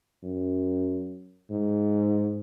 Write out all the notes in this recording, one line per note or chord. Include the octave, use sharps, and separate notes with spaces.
F#2
G#2